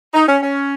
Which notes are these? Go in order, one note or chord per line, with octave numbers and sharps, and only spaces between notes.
D#4
C#4
C#4